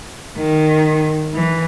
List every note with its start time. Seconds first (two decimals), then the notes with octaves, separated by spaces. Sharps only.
0.38 D#3
1.34 E3